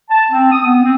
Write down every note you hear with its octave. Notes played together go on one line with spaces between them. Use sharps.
A5
C4
D#6
B3
C4